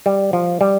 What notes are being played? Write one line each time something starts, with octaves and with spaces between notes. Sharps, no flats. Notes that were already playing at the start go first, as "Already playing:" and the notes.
G3
F3
G3